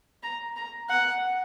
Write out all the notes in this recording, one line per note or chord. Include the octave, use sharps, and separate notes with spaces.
A#5
A#5
F#5